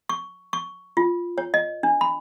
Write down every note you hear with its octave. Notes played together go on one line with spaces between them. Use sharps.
C#6
C#6
F4
C#5
D#5
D4
B5